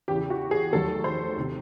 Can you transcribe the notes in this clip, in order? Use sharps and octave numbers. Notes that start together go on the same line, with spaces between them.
E2 C#3 E3 G4
F#4
G#4
F1 D#2 D#3 F#3 A4
C5
C3 D#3